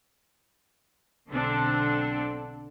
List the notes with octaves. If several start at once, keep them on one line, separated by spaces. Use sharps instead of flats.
B1 D3 C4 D4 A4 A5